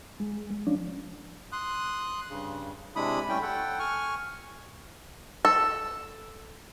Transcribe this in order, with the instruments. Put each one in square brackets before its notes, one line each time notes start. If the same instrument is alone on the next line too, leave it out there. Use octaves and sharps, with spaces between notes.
[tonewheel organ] G#3
F3 C#4 D4
[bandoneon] C6 D#6 F#6
G2 C#3
C3 G#3 D4 E4 B5 D#6
G3 A3 C#4 E4 G5
A4 F#5 G5
G#5 C#6 F6
[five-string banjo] A4